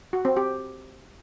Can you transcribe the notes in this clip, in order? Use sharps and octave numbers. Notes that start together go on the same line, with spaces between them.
F#4
C4
G4